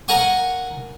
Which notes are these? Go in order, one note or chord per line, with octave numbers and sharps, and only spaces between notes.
A#4 F5 F#5 G#5 C#6